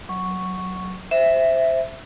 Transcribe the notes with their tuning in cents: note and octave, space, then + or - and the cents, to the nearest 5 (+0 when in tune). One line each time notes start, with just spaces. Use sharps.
F#3 +0 C#6 +0
C5 +0 E5 +0